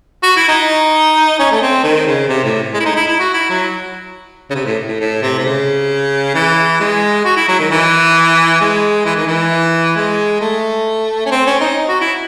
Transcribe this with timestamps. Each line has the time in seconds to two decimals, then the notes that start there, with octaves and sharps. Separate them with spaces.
0.23 F#4
0.37 E4
0.48 D#4
1.39 C#4
1.52 A3
1.62 C4
1.84 D#3
2.06 C#3
2.29 C3
2.44 A2
2.74 G#3
2.80 E4
2.85 D#4
2.96 E4
3.08 E4
3.19 F#4
3.34 E4
3.50 F#3
4.50 C#3
4.55 C3
4.66 A2
4.88 A2
5.00 A2
5.22 C3
5.39 C3
5.45 C#3
6.35 E3
6.80 G#3
7.25 F#4
7.37 E4
7.48 F#3
7.59 D#3
7.71 E3
8.61 G#3
9.05 E3
9.16 D#3
9.26 E3
9.96 G#3
10.41 A3
11.26 C#4
11.31 C4
11.47 C#4
11.61 D#4
11.89 F#4
12.01 E4